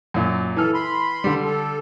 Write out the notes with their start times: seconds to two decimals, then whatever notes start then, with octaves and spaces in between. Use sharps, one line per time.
0.14 F#2 A#2
0.56 E3 A4 F6
0.74 B5 C6
1.24 D3 G3
1.45 A4